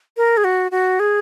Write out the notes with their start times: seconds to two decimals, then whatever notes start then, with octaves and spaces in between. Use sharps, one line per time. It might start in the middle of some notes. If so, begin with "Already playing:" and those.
0.17 A#4
0.37 G#4
0.44 F#4
0.71 F#4
1.00 G#4